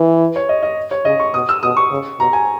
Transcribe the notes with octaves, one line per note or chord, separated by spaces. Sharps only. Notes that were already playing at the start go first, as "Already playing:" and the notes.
Already playing: E3
C#5
D#5
D#5
C#5
C#3 D#5
C#6
B2 D#6
E6
B2 D#6
C#6
C#3
B2 A#5
G#5